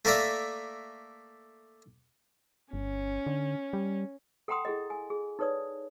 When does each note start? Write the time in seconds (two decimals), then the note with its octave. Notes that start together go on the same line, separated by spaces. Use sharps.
0.05 A3 A#3 A#4 D5 E5
2.73 G1 C#4
3.27 D3
3.73 G3
4.48 A4 F#5 G5 A#5 C6 D#6
4.65 E4 G#4 A4 D#5
4.90 G#5
5.10 G#4
5.39 D#4 A4 B4 C#5 D5 D#6